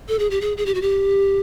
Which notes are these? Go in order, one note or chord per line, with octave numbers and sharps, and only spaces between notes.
A4
G#4
G4
G#4
G#4
G4
F#4
G4